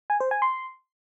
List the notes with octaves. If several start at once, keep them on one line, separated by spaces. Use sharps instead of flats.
G#5
C5
G#5
C6